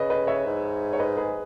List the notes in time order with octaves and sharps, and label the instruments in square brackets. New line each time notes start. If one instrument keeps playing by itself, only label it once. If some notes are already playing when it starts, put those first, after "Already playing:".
Already playing: [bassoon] C#3 [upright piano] B4 D#5
[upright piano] B4 D#5
C#5 E5
[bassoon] G#2
[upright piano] C#5
B4 D#5
G#4 B4